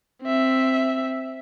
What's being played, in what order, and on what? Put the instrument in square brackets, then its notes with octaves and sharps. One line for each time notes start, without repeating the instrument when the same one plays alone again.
[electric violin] C4 E5